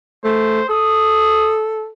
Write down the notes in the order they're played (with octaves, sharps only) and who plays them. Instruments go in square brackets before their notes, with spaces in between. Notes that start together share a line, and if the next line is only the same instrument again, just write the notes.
[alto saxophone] A3 [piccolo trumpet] C5
[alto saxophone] A4 [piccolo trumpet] D#6